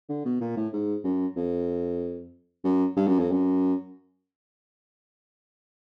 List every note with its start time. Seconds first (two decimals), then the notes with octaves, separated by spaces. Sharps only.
0.09 D3
0.25 B2
0.41 A#2
0.57 A2
0.73 G#2
1.04 F#2
1.36 F2
2.64 F#2
2.97 G2
3.07 F#2
3.19 F2
3.32 F#2